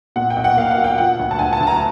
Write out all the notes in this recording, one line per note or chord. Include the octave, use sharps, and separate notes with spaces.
A#2 F#5
G5
B1
F#5
A#3 F5
F#5
F#3
G5
F3 F#5
D2
A5
D2 G#5
A5
D2
A#5